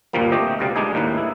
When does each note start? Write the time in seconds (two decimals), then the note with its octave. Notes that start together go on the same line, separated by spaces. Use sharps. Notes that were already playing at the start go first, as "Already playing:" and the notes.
0.13 D2 G2 A#2 F3 G3 A#3
0.32 A3 C4 G4 D#5
0.59 C#2 B2 G3 F5
0.76 G3 G#3 D4 D#4 G#4
0.94 D#2 A2 A#3 D#4 B4
1.18 E4